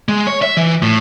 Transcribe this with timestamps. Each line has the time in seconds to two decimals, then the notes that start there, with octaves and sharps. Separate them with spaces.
0.09 G#3
0.27 C#5
0.42 E5
0.57 E3
0.83 A2